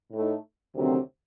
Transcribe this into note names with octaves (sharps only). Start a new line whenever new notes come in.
A2 A3 D#4
D2 C3 D#3 F#3 C4